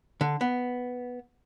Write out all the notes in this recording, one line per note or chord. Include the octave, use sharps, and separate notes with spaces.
D3
B3